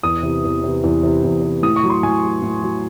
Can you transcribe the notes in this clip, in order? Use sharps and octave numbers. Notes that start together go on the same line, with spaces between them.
E2 D#6
C3 E3
E2
C3 E3
E2
C3 E3
E2
C3 E3
A2 D#6
C#6
F#3
C6
A2 G#5
F#3
A2
F#3